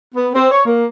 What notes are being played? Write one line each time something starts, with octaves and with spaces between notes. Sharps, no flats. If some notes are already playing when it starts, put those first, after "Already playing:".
B3
C4
C#5
A#3